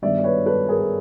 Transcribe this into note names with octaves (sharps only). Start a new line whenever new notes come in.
G2 D#3 G3 B3 D5 E5
D5
B4 C#5
A4 B4
G#4 A#4